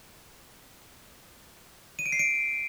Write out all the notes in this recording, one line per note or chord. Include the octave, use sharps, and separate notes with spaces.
D#7
D7
C7
D7